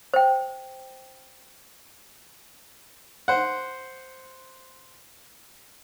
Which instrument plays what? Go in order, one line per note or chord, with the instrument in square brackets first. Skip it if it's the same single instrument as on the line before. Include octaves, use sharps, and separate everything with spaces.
[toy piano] C5 G5
[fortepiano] C5 F#5